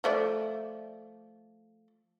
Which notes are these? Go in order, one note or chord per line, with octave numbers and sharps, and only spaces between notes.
F3 A3 D5